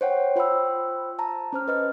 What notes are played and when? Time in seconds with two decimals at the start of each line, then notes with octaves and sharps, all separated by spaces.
0.01 C5 C#5 F#5 G5
0.36 F4 C5 G5 B5 E6
1.19 A5 A#5
1.53 C#4 C5 F6
1.68 B4 D#5 F6